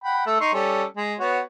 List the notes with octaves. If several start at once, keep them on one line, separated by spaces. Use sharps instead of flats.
F#5 G5 B5
A3 A4 E5
D#4 C6 C#6
G3 C#4 A4
G#3
B3 F#4 C#5